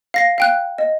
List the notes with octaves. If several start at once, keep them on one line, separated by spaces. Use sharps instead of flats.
F5 A#6 C7
F5 G5 F#6
D#5